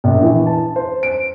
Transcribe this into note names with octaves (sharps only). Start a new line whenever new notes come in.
A#1
E3
A5
C5
D7